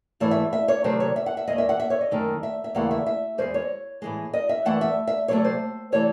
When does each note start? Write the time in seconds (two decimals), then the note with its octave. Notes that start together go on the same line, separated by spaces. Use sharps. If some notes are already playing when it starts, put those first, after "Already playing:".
0.20 G#2 E3 A3 C#5
0.31 E5
0.53 E5
0.68 C#5
0.84 C3 D#3 F#3 A3 C5
1.00 C#5
1.16 E5
1.26 F#5
1.37 E5
1.47 D#2 D#3 G#3 D#5
1.58 E5
1.69 F#5
1.80 E5
1.90 C#5
2.01 D#5
2.11 F#2 D#3 A3
2.43 E5
2.64 E5
2.75 D#2 C#3 E3 A3 F#5
2.91 E5
3.06 E5
3.38 E2 C#3 G#3 C5
3.54 C#5
4.02 A2 E3 G#3
4.33 D#5
4.49 E5
4.65 F#2 E3 A3 F#5
4.81 E5
5.07 E5
5.28 C3 F#3 A3 C#5
5.45 C5
5.92 C3 E3 A3 C#5